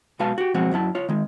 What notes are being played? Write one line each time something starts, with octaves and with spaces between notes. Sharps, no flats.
B1 G#3 F#4 B4 F5 A5
F#4 G4
B1 F3 G#3 C4 F#4
F#2 F#3 E4 A5
F4 C#5
D#3 G#3